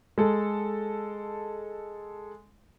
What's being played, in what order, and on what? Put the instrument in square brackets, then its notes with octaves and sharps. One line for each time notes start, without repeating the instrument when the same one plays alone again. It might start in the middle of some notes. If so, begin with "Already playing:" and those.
[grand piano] G#3 A4